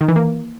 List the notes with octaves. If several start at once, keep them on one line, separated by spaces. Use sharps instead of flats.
D#3
E3
A#3